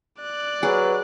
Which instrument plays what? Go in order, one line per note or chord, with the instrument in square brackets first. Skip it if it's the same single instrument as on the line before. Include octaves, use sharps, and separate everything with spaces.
[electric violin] D5 F#6
[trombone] F#3 [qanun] G#4 [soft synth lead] B4